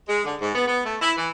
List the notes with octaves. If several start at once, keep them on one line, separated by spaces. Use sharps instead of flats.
G#3
D3
G#2
B3
B3
A3
E4
E3